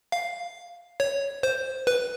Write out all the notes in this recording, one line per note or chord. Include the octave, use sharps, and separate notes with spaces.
F5
C#5
C5
B4